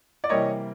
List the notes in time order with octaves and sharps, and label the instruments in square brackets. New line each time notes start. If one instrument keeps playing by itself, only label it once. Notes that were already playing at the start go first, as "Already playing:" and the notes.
[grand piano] D5
C3 E3 G3 A#3 C#5 D#5